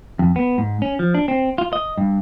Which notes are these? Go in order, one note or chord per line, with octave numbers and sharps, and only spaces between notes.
F2
B3
G#2
C#4
F3
D4
C4
F4
D#5
G2